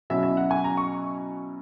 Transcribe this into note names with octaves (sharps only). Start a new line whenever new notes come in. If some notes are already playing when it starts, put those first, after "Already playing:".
B2 F#3 C#4 E4 E5
E5
F#5
G#5
A#5
C#6